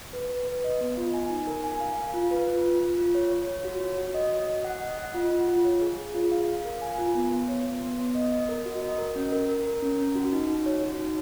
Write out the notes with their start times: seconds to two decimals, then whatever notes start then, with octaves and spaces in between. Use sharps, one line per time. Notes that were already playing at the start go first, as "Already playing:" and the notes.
0.13 B4
0.30 B4
0.47 B4
0.64 D#5
0.81 B3
0.97 F4
1.14 G#5
1.30 D#4
1.47 A#4
1.64 G#5
1.80 F5
1.97 F5
2.14 F4
2.31 B4
2.48 F4
2.65 F4
2.80 F4
2.98 F4
3.15 C#5
3.31 C#5
3.47 C#5
3.65 F#4
3.81 C#5
3.98 F#4
4.14 D#5
4.32 D#5
4.48 D#5
4.64 F#5
4.81 D#5
4.98 F#5
5.14 F4
5.31 F4
5.48 F4
5.65 C#5
5.81 G#4
5.98 G#4
6.14 F4
6.31 F5
6.48 F5
6.65 A#4
6.82 G#5
6.98 F4
7.15 B3
7.31 B3
7.48 C#5
7.65 B3
7.82 B3
7.99 B3
8.15 D#5
8.32 D#5
8.49 A#4
8.66 F#4
8.82 D#5
8.98 A#4
9.16 C#4
9.32 A#4
9.49 A#4
9.66 A#4
9.82 C#4
9.99 C#4
10.15 F#4
10.33 D#4
10.50 D#4
10.66 C#5
10.83 F#4
10.99 D#4